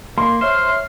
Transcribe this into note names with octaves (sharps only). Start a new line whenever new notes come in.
A#3 C6
C5 C#5 E5 F6 C7